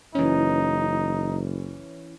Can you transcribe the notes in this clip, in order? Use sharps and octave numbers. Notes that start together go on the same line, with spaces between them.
F#1 E3 C#4 D#4